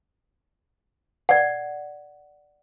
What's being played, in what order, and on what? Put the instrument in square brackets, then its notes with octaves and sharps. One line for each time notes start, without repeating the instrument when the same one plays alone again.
[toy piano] D5 F#5